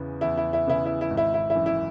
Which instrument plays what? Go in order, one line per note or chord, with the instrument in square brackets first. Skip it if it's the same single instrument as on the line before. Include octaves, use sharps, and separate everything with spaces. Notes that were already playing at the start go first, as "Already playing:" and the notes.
Already playing: [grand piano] E2 C#3 E3 B3
[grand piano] E2 [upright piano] E4
[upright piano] E4
E4
[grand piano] C#3 E3 B3 [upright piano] E4
[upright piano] E4
E4
[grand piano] G#1
[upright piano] E4
E4
E4
[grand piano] F#2 E3
[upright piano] E4